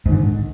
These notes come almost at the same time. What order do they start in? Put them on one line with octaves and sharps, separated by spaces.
G#2 D#3 D3